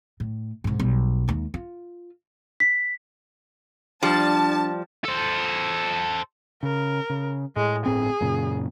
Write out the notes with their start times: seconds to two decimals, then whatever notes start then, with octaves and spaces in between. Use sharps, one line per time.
0.20 A2
0.64 C2 G#2
0.79 B1 G3
1.28 D#2 G#3
1.54 F4
2.60 B6
4.03 F3 G3 D4 A5
5.05 A4 C5
6.63 C#3 A#4
7.10 C#3
7.56 A2 G#3
7.86 G1 A2 C4 G#4
8.21 F#2 A#2 C#3